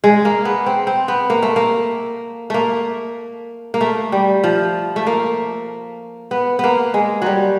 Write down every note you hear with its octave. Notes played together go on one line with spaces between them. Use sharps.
G#3
A#3
B3
C4
C4
B3
A#3
A3
A#3
A3 A#3
A#3
A3
G3
F3
A3
A#3
B3
A#3 B3
G#3
F#3 G3